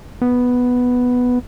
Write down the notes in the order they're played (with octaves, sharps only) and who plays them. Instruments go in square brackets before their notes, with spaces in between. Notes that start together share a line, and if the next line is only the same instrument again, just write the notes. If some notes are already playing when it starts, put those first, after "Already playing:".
[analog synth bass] B3